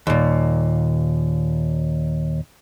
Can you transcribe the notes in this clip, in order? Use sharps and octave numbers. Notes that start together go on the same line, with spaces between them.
D#2 A#2